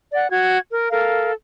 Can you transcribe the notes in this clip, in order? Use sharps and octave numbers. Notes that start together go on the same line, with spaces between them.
D5 F#5
F#4 G#6
A#4
A4 A#4 F5